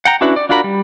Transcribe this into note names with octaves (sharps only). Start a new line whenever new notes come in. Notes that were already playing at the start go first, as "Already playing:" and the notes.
F#5 G5 A#5
C#4 D4 E4 F#4 B4
D5
D4 F4 F#4 A#4 B5
G3